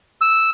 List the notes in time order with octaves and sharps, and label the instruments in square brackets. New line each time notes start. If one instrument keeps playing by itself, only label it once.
[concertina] E6